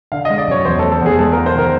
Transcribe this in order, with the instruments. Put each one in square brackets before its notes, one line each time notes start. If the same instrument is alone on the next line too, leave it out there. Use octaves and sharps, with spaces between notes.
[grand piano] D3 F5
D#5
G#3
D5
F#2 C#5
E2 C5
A4
A3
A4
E2 G#4
G#3 A4
A#4
F4
C5
D#3 A#4